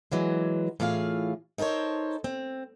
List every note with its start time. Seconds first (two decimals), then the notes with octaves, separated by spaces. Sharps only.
0.12 E3 F#3 G#3
0.80 A2 E3 F4 G#4 F5
1.58 D#4 A4 A#4 C5 C#5
2.24 C4